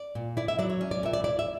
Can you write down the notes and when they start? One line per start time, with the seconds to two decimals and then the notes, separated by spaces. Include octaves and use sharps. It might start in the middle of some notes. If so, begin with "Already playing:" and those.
Already playing: D5
0.15 A#2
0.37 E4 D5
0.48 E5
0.59 F#3 D5
0.70 C#5
0.81 C#4
0.91 D5
1.03 A#2 E5
1.13 D5
1.24 E4 D5
1.39 E5